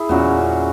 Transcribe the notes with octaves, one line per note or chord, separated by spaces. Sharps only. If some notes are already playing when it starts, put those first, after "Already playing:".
Already playing: E4 G#4
E2 A#2 F#3 C#4 F#4